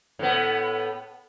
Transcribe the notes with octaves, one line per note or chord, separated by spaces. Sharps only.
A2 B3